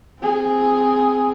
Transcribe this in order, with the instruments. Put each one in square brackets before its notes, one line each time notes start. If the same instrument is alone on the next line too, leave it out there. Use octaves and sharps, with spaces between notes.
[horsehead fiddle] C4 G#4